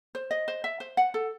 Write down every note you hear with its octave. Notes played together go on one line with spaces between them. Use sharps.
C5
D#5
C5
E5
C5
F#5
A4